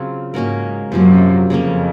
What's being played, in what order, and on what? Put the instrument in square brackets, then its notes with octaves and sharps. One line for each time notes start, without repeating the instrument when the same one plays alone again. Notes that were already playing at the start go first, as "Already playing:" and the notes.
Already playing: [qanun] C#3 F#3 C4 F4
[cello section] G#2 [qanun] A#3 C#4 F#4 A#4
[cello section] F#2 [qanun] C3 F3 A#3
[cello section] F2 [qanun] C#3 F3 A#3 C#4